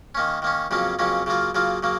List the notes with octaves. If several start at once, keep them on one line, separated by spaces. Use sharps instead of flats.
D#3 A#3 C#4
D#3 A#3 C#4
F2 C#3 F#3 A#3 C#4
F2 C#3 F#3 A#3 C#4
C#3 F#3 A#3 F4
C#3 F#3 A#3 F4
C#3 F#3 A#3